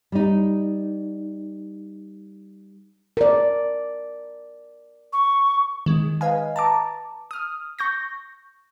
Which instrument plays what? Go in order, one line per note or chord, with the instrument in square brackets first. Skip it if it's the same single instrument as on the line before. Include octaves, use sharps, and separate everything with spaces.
[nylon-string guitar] G3 D#4
[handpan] A#4 D5
[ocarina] C#6
[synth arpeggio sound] D#3 G#3
B4 D#5 F5 G#5
A5 A#5 D6
D#6 F6
C#6 G6 A#6